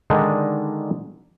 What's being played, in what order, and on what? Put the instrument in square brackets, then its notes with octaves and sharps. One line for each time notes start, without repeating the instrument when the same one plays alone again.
[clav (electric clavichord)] D3 D#3 G#3 D4 D#4